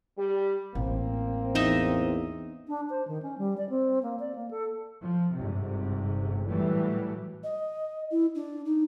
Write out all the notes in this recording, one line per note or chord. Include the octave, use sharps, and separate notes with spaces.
G3 G4
A1 A#3 C4
E2 D#4 D#5 E5
D4
C5
D#3
C#4
G3
D5
C4
A#3
D5
A#3
A4
F3
G1 G#2 C3
A2 E3 F#3 G3 A3
D#5
E4
D4
D#4